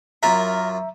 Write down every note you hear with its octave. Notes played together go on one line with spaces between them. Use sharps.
F#2 F4 A#4 E5 A#5 B5